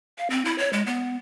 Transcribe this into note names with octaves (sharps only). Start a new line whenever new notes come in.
F5
C4
E4
C#5
G#3
B3